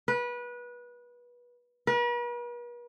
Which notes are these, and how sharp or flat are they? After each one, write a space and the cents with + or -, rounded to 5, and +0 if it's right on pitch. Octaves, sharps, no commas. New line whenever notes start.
B4 -25
B4 -45